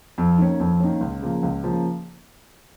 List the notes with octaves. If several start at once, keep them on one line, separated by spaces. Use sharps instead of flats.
F2
D#3 A#3 C#4
F2
D#3 A#3 C#4
C#2
C#3 F3 A#3
C#2
C#3 F3 A#3